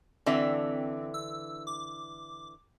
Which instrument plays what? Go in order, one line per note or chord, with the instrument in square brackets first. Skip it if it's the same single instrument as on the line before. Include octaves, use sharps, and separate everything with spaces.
[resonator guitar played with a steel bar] D3 E3 E5 [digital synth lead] C4
[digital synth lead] E6
D6